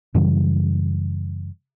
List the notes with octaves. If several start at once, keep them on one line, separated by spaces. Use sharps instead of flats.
F#2 C#3 E3 G3